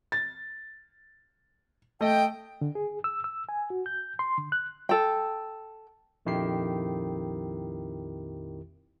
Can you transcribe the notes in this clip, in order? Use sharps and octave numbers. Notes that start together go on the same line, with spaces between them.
A6
A3 D#5 G5
D3
G#4
E6
E6
G#5
F#4
G6
C6
D3
F#6
A4 G5
A#1 F2 D#3 E4 G4 C7